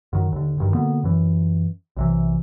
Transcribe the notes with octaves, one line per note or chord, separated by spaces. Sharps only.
F#2 D#3
D#2 D3
E1 G2 D#3
B2 D3 A#3 B3
F#2 E3
B1 C3 E3